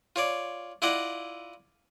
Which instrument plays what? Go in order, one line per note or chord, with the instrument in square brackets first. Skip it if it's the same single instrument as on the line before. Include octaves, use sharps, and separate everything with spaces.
[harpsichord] F4 C#5 D5
E4 F4 D5 D#5 F#5